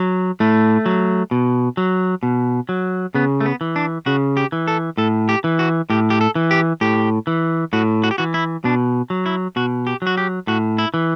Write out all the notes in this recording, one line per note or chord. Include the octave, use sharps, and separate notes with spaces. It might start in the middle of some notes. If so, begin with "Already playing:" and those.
Already playing: F#3
A2 A3
F#3
B2
F#3
B2
F#3
C#3 B3
A3
B3
E3
D4
C#3 F#4
G4
E3
A4
A2 A4
G4
E3
F#4
A2 G4
G4
A4
E3
G4
A2 G4
E3
A2 F#4
F#4
G4
E3 F#4
E4
B2 D4
F#3
E4
B2 F#4
G4
F#3 F#4
G4
A2 F#4
E4
E3